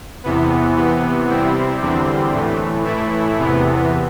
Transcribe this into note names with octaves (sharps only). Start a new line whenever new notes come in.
E2 C3 E3 B3
C3 E3 B3
C3 G3 C4 E4
E2 D3 G3 C4
A2 E3 A3
A2 E3 A3 E4
E2 C3 E3 B3